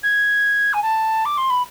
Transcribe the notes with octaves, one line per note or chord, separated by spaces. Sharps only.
G#6
G#5
A5
D6
C6
B5